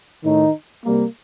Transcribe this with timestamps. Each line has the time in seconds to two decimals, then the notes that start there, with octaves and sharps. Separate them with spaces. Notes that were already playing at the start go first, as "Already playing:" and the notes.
0.23 A2 D#3 A3 D#4
0.84 C3 G3 A#3